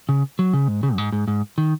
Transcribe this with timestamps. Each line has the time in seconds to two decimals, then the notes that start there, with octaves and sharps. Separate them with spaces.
0.09 C#3
0.39 F#3
0.53 C#3
0.68 G#2
0.83 C#3
0.94 F#2
0.98 G#2
1.12 G#2
1.28 G#2
1.58 D#3